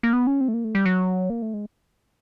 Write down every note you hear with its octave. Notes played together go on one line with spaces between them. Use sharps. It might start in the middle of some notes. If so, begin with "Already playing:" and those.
A#3
B3
C#4
C4
A3
A#3
A3
G3
F#3
A#3
A3
G#3